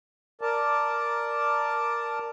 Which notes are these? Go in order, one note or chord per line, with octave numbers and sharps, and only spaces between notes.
A#4 D5 A5